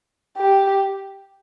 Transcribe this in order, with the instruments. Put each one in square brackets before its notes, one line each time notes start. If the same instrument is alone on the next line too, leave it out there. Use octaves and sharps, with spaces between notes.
[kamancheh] G4